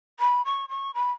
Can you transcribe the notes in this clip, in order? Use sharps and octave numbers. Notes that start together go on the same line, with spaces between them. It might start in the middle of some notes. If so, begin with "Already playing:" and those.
B5
C#6
C#6
B5